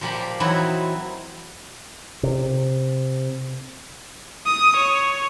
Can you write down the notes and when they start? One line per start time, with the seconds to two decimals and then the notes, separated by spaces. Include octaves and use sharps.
0.01 A#2 F3 A#3 G4 G5 B5
0.40 E3 F#3 C4 D#4 E4 B4
2.23 C3
4.46 D#6
4.76 C#5